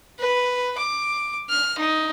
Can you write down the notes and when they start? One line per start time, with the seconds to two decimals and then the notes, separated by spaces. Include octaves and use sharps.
0.19 B4
0.78 D6
1.50 F6
1.78 D#4